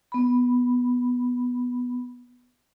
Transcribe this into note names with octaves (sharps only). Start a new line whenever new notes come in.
B3 B5